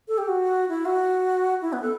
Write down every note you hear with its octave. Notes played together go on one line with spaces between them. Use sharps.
A4
G4
F#4
E4
F#4
E4
B3
A4